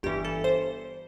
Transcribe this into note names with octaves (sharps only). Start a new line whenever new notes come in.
G1 G2 E3 G4
A4
C5